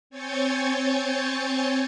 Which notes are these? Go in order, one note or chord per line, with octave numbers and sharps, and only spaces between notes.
C4 C#5 G#5 G6 A6 C#7